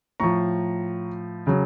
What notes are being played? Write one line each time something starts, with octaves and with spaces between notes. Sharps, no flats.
A2 F3 A#5 C#6
C#3 F#3